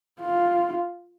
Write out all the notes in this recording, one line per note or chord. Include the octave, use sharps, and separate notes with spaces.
F4